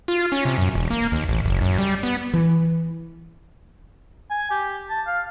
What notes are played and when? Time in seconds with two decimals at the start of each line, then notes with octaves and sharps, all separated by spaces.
0.08 F4
0.32 C#4
0.45 C3
0.58 F#2
0.75 E1
0.90 A#3
1.12 D#2
1.28 A1
1.45 F#1
1.61 F#2
1.78 G3
2.03 B3
2.34 E3
4.30 G#5
4.51 G4
4.90 A5
5.07 F5